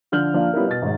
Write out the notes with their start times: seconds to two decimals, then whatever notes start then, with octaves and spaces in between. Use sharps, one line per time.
0.12 D3 F3 F6 G6 F#7
0.34 F3 A#3 D4 F4
0.53 G3 B3 C#4 E4 F4 A#4
0.67 B2 A6
0.82 G#1 G#2